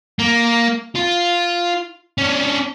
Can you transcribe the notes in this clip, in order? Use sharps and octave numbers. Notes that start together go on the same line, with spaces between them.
A#3
F4
C#4 D4